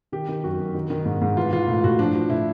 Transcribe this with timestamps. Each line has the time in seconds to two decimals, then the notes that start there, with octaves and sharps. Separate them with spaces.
0.12 D#3 G4
0.29 D#3
0.44 F#2 F#4
0.59 F#2
0.74 D#3
0.90 D#3
1.05 G#2
1.22 G#2
1.37 E3 F4
1.52 E3 F4
1.68 A2
1.84 A2 F#4
1.99 F3 D4
2.15 F3
2.30 A2 E4